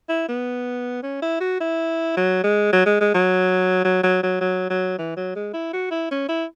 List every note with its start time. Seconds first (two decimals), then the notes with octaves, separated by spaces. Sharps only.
0.09 E4
0.28 B3
1.03 C#4
1.22 E4
1.40 F#4
1.60 E4
2.17 F#3
2.44 G#3
2.72 F#3
2.86 G#3
3.00 G#3
3.14 F#3
3.84 F#3
4.03 F#3
4.23 F#3
4.41 F#3
4.70 F#3
4.98 E3
5.17 F#3
5.36 G#3
5.53 E4
5.73 F#4
5.91 E4
6.11 C#4
6.29 E4